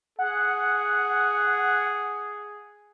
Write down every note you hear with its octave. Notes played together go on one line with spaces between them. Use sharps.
G#4 F#5